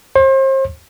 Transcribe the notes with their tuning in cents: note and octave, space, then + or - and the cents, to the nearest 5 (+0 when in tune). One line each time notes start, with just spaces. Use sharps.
C5 +40